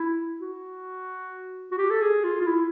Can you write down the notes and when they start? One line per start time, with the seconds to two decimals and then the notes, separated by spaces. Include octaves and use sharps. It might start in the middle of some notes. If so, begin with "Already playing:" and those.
Already playing: E4
0.41 F#4
1.71 F#4
1.78 G4
1.90 A4
2.01 G#4
2.24 F4
2.41 F4
2.47 E4